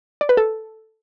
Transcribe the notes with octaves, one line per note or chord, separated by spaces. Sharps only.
D5
B4
A4